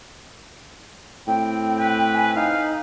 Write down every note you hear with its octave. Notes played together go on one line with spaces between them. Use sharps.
A2 C4 G5
B4
G#5
D#4 F5